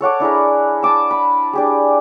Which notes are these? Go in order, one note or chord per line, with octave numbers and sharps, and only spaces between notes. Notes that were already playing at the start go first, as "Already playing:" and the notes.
A4 C#5 F#5 D6
D4 E4 G#4 A#4
A5 D6 E6
B5
D4 G4 G#4